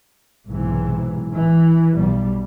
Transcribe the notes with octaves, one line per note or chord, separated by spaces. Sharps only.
B1 G#2 C3 E3
E3
B1 B2 G3